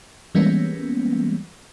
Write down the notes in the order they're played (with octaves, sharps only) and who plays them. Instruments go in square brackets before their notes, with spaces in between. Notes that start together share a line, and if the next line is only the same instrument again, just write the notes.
[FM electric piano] E3 G3 G#3 A#3 B3 C#4